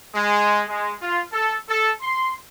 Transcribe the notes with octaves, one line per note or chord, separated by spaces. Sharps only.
G#3
G#3
F4
A4
A4
C6